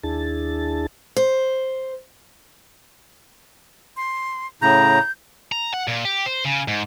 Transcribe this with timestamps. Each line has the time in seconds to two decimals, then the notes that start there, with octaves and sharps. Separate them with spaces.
0.03 D#2 D4 E4 G#4 A5 A6
1.17 C5
3.97 C6
4.62 A2 C#3 A#5 G6
5.52 A#5
5.74 F#5
5.88 A#2
6.05 G4
6.26 C5
6.45 C#3
6.68 G#2